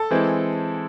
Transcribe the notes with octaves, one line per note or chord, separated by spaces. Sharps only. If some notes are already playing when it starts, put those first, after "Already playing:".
Already playing: A4 A5
E3 G#3 C4 E4